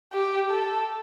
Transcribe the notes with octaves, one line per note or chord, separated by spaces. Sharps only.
G4
A4